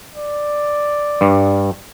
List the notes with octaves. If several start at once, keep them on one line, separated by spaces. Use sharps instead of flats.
D5
G2